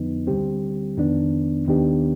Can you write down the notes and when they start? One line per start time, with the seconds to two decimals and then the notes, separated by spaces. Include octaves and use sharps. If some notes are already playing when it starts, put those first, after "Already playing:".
Already playing: F2 D3 F3 B3 D#4
0.27 D2 D3 G3 C4 G4
0.97 F2 D#3 B3 D4
1.67 D#2 D#3 B3 D4 G4